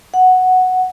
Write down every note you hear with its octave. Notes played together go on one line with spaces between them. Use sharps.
F#5